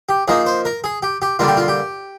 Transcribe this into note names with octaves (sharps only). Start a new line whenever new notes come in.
G4
F3 A#3 D#4 G#4
C5
A#4
G#4
G4
G4
D3 G3 A#3 F4
G4
F4
G4